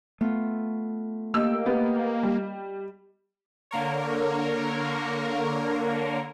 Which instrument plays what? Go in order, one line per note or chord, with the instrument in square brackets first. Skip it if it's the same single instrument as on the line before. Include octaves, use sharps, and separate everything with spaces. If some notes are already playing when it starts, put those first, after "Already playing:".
[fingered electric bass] A3 [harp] B3 F4
[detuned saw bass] A#3 [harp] G4 D#5 G5 [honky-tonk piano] E6
[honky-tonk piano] B3 [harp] G4
[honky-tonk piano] G3
[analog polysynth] D3 A#3 A#4 C#5